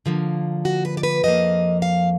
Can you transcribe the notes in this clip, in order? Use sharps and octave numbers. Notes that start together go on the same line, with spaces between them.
D3 F3 A#3
F#4
B4
D5
B4
F2 F3 A#3 D#5
F5